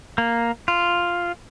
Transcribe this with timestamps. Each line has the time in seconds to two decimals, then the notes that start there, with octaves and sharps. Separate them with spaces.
0.18 A#3
0.68 F4